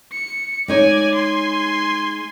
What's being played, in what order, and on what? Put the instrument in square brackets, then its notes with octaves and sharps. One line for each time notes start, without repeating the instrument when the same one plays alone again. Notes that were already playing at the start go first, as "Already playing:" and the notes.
[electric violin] C#7
[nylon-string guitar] G#3 D#4 C#5 [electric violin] D5 G#5
[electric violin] G#5 C6